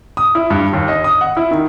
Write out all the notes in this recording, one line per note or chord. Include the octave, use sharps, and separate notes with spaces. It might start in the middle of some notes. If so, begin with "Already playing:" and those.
D#6
E4
G2
D#2
D#5
D#6
F#5
E4
D#3